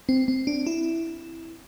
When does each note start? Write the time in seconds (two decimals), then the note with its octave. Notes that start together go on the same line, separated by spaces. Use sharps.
0.09 C4
0.28 C4
0.47 D4
0.67 E4